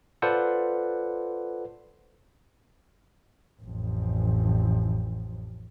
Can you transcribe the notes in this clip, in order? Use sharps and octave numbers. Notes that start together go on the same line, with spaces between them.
F4 A4 B4 C5 D5 F#5
A1 F2